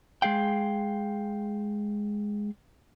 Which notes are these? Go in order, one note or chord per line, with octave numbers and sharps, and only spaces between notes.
G#3 G#4 F5 G5